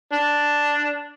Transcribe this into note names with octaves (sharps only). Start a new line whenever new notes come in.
D4